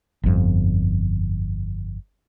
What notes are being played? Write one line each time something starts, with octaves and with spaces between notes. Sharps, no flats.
G1 F2